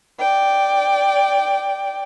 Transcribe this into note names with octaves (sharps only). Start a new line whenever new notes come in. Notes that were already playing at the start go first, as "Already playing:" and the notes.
D5 G5